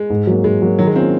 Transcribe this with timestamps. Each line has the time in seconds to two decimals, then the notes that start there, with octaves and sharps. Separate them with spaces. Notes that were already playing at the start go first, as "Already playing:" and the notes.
Already playing: G#3
0.10 G#2
0.27 F#3 A#3
0.44 G#2 G#3
0.62 F#3 A#3
0.79 D#3 F#3
0.87 G#3
0.96 A#3 C4 C#4 F4